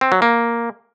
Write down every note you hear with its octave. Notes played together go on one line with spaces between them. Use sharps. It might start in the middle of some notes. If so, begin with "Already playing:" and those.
C4
F#3
A#3